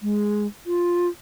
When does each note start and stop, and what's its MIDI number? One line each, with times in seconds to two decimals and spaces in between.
0.01 0.47 56
0.66 1.08 65